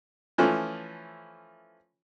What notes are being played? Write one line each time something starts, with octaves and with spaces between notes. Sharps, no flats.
E3 F3 A3 C#4